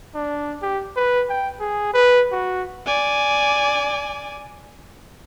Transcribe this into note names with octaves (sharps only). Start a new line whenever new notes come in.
D4
G4
B4
G5
G#4
B4
F#4
D5 G#5